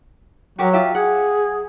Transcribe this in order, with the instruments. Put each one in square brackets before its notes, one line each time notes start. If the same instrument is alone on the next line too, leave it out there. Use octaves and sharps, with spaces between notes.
[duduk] F#3 [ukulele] F#4 G4 A#4
[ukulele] F4 G4 E5
[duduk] G#4 [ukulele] F#5